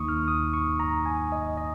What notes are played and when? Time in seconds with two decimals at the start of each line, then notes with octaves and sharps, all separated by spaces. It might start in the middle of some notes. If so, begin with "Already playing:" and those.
Already playing: D#2 D#3 A#3 D#4 C#6 D#6
0.08 F6
0.28 D#6
0.54 C#6
0.80 A#5
1.06 G#5
1.32 D#5
1.57 D#5